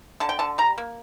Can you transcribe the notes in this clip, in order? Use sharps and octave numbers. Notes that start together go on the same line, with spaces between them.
D3 A5
G5
D3 A5
G3 A#5
A#3